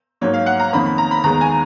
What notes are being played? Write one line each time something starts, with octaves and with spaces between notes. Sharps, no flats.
G#2 F#3 A#3 C#5
F5
F#5
A#5
F2 D#3 A#3 C#4 B5
B5
A#5
B5
D#2 D#3 G#3 B3 A#5
G#5